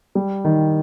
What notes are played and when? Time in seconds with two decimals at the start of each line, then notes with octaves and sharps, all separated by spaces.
0.15 G3
0.45 D#3